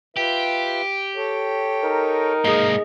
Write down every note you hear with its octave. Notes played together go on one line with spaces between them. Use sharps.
F4 G4 B4 E5
A4 C#5 G5
D#4 A#4
G#2 A#3 G#4 D#5